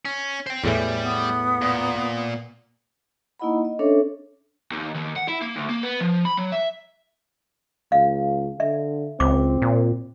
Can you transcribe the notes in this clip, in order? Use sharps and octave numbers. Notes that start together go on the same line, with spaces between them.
C#4
C5 G5
E2 A2 E3 G3
B3
A#2
A#3 D#4 E4 D#5 F#5 B5
D#5
C#4 D4 A4 A#4 C#5 E5
D#2
D#2
F#5
E4
A#3
D2
A#3
B3
F3
B5
F#3
E5
C#2 F5
D3 E5
C#2 C4 D6
A#2